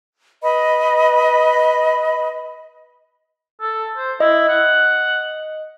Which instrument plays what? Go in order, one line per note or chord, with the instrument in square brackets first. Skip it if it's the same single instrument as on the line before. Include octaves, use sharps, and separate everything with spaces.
[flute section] B4 D#5 B5
[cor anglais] A4
C5
[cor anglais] E4 [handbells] D#5
[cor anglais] F#5